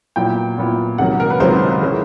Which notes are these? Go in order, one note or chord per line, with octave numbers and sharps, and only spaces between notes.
A#2 F#3 B3 E4 G5
A#2 F#3 B3 E4
C#2 C3 D#3 F#3 A#3 F#5
A#4
B4
C#2 C3 D#3 F#3 A#3 C5
E3 G#3 C#4 E4